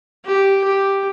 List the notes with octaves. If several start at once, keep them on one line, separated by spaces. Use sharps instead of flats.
G4
G4